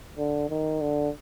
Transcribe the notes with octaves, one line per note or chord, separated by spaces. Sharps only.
D3
D#3
D3